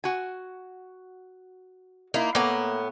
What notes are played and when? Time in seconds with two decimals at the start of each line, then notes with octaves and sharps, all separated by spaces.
0.04 F#4 G#5
2.14 A#3 D#4 E4
2.35 A2 A#3 B3 A#5